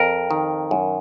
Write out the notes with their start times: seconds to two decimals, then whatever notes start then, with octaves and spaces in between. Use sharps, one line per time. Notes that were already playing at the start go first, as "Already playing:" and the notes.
Already playing: F2 A#4
0.31 D#3
0.71 F#2